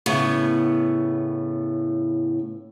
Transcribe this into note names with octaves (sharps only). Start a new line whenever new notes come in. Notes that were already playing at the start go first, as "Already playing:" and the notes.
A2 C#3 B3